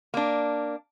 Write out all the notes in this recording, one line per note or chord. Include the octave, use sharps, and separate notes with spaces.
A#3 D4